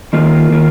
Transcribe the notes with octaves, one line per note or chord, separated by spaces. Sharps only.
D#3 A#3 F4 A#4
D#3 A#3 F4 A#4